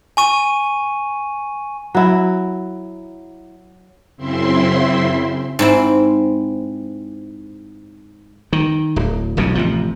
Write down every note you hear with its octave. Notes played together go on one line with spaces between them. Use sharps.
G#5 C#6 D#7
F#3 E4
F#2 C#3 C4 E4 E5 C6
G#2 C4 E4
D#3
D1
E1 B1 F2 C#3
A1 C3 F3